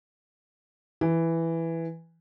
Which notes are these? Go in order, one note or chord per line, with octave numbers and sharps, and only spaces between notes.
E3